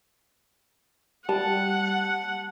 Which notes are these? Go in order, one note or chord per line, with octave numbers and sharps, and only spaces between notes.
G3 F#5 A5